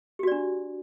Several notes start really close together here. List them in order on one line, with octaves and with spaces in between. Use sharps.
G4 F#4 D5 D4